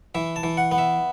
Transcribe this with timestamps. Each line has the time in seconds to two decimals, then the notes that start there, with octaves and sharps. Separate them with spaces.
0.15 E3 E5
0.36 A5
0.43 E3
0.57 F#5
0.72 B3
0.78 E5